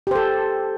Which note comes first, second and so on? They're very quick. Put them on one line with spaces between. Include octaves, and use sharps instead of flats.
G4 C5 A4